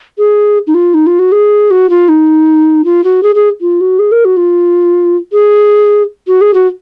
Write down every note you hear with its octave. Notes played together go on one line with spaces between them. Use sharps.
G#4
D#4
F4
D#4
F4
F#4
G#4
F#4
F4
D#4
F4
F#4
G#4
G#4
F4
F#4
G#4
A#4
F#4
F4
G#4
F#4
G#4
F#4